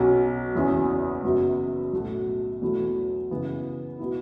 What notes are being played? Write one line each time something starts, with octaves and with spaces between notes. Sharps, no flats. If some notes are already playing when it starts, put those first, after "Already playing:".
Already playing: B1 B2 F#3 C#4
F#1 E2 E3 C#4 F#4
F#1 F#2 F#3 B3
B1 A2 A3 F#4
E2 B2 F#3 A3 E4
F#2 C#3 E3 B3
B2 B3 E4